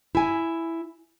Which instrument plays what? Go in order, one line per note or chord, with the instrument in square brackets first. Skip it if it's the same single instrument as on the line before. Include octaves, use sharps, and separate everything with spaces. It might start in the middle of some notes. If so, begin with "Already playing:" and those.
[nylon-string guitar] E4 G#5